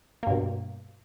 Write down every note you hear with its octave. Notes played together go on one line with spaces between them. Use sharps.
G2 B2 A#3